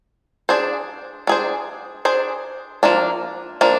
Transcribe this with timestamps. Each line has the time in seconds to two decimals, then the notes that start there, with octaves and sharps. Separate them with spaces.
0.49 D4 G#4 C5
1.27 D4 G#4 C5
2.05 D4 G#4 C5
2.83 F3 A#3 D4
3.61 F3 A#3 D4